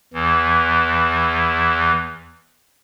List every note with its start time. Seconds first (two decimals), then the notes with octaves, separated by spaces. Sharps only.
0.13 E2 E3